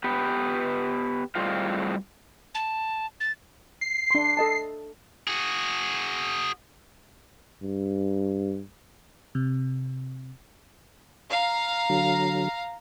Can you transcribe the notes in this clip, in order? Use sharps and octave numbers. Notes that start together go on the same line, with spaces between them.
B3 G4 B4
A2 G3 G#3 C4 F4 F5
A5
A6
C7
D4 C6
A4 D#5 A5
F#4 G#4
G2
C3
F5 A#5
D3 F#3